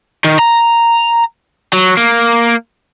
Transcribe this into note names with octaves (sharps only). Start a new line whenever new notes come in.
D#3
A#5
F#3
A#3